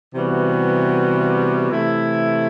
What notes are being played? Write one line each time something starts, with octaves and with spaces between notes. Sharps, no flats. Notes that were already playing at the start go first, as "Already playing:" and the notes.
C3 E3 G3 B3 F#4
C3 E3 A3 E4